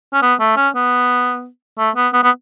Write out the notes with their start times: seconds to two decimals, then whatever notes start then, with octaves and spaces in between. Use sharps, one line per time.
0.13 C#4
0.22 B3
0.40 A3
0.57 C#4
0.75 B3
1.78 A3
1.96 B3
2.13 B3
2.23 B3